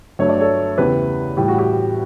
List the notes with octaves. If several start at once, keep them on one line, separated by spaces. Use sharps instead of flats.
G2 F#3 A3 C#5
D5
A4 C#5
E2 C#3 E3 G4 B4
A2 E3 G3 G4
F#4
G4